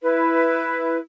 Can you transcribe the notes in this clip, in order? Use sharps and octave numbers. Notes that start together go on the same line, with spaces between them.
E4 B4